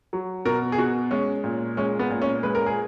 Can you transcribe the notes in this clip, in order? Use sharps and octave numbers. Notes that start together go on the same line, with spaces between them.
F#3
B2 A#4
G#4
B2 F#4
G#3 C#4
A#2
G#3 C#4
B3
A#2
C#4
G#3 B4
A#4
G#4